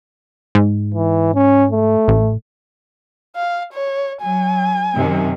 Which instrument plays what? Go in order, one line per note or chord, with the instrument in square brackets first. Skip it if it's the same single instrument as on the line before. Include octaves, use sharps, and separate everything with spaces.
[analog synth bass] G#2
[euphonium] E3
C#4
A3
[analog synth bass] A1
[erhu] F5
C#5
[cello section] F#3 [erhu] G#5
[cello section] F#2 C3 D#3